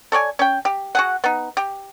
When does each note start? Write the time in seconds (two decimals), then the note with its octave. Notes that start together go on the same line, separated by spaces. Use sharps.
0.12 A4 C#5 D5 G#5
0.39 C#4 G5
0.65 G4
0.95 F#4 G#4 F#5
1.24 B3 D#4
1.57 G4